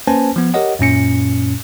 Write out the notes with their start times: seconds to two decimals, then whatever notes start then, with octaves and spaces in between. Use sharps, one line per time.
0.07 A#3 C#4 B4 C5 G#5 A5
0.36 F3 B3
0.54 G4 A#4 C#5 D#5 F#5
0.79 F#2 A#2 C#4 C#7